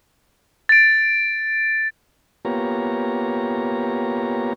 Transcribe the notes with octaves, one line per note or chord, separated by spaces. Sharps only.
A6 D7
A#3 B3 F4 G4 C#5 A#5